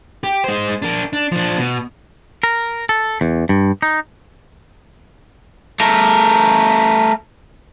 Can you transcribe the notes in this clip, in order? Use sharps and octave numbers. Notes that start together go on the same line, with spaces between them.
G4
G#3 C5
D4 A#4
D4
F3 D4
B2
A#4
A4
E2
G2
D#4
A3 A#4